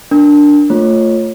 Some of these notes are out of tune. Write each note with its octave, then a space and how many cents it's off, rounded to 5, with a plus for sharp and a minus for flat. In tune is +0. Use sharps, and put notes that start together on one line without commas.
D4 +0 A#4 +0
A3 +25 F4 +5 C#5 -20